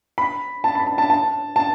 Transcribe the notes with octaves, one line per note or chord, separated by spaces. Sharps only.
B5
A5
B5
A5
A5
A5
A5